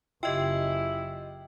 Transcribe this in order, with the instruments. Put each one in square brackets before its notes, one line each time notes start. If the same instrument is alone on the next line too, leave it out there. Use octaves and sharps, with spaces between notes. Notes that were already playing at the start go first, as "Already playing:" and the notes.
[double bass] F#1 C#3 [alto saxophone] E4 [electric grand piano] F4 G4 [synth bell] D#5 G5